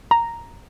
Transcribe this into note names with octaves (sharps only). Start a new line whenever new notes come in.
A#5